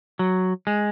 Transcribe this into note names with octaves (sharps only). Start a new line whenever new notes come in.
F#3
G#3